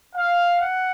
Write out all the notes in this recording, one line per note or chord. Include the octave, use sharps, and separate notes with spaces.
F5
F#5